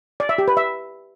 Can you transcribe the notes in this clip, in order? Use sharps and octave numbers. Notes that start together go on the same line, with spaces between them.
D5
E5
G4
B4
E5